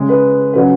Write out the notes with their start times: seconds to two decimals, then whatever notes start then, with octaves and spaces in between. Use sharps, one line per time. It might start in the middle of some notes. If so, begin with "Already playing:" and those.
Already playing: C#3 G#3 C#4
0.09 B4
0.54 C#3 F#3 C#4 B4